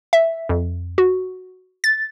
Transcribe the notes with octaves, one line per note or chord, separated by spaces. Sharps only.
E5
F2
F#4
A6